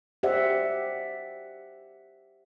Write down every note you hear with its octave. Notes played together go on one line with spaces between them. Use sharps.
G4 C5 D5 E5 F#5